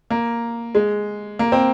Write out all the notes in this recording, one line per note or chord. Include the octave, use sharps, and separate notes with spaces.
A#3
G#3
A#3
C4